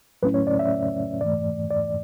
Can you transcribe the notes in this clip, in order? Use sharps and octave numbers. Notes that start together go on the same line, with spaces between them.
A2 F#3 A3 C#4 E4 B4
C#5
D5
E5
G#2 E3 A3 D5
D5